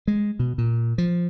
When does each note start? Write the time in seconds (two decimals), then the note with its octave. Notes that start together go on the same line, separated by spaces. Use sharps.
0.08 G#3
0.39 B2
0.58 A#2
0.98 F3